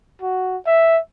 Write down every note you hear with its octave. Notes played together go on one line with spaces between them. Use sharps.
F#4
E5